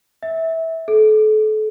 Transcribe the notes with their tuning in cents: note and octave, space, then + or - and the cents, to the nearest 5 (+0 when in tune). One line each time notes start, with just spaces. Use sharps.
E5 -20
A4 -35